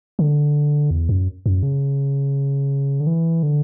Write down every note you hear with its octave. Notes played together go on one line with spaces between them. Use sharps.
D3
E2
F#2
F#2
C#3
D3
E3
D3